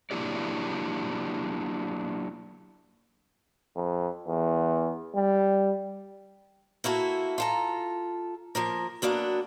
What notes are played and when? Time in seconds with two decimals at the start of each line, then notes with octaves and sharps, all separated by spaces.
0.11 F#3 A#3 D4 E4 G4 D5
3.76 F2
4.27 E2
5.16 G3
6.84 A#3 E4 F#4 A4
7.38 F4 A4 A#5
8.55 F3 A#3 A#4
9.02 F#3 A#3 B3 D4 F#4